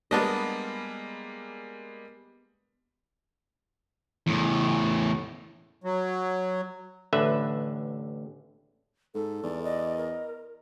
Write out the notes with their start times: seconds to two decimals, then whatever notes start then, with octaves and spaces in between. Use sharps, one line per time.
0.11 G3 G#3 A#3 B3 D4 D#5
4.27 E2 A2
5.84 F#3
7.13 A1 D3 B4 E5
9.15 G#2 A4
9.43 E2 D5
9.63 D5 D#5
9.97 A#4